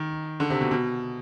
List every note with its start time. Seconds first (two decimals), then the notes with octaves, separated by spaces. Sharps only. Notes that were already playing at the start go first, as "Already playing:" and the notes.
Already playing: D#3
0.40 D3
0.50 C3
0.61 B2
0.71 B2